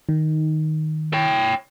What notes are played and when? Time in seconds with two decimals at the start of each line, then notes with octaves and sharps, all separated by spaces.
0.09 D#3
1.13 C#5 G5